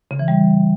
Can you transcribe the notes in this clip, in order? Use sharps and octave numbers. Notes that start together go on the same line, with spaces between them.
C#3
E3
G3